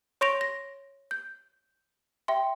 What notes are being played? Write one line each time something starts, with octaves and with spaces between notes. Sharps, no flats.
C#5 C6 C#6 A#6 D7 F7
A#6
G6
E5 G5 C6